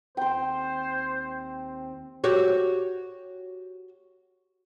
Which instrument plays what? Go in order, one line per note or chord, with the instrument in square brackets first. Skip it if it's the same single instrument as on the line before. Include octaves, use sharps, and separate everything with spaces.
[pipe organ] D#2 C4 [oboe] C5 [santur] G5 C6
[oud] F#4 G4 C#5